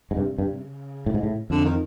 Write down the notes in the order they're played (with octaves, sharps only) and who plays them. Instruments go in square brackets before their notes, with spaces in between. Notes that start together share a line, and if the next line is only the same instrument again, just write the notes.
[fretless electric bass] G#2
[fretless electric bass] G2 [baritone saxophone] C3
[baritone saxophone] C3
[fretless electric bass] G2
[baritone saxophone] C3
C#3
[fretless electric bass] A2
G#2
A2
[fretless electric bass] F2 [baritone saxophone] D3
[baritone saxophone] D#3